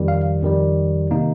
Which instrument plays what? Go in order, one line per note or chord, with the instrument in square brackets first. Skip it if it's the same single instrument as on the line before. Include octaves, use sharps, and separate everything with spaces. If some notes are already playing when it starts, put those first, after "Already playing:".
Already playing: [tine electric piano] F2 D#3 G3
F5
F2 D#3 G3
C3 D#3 A#3 D#4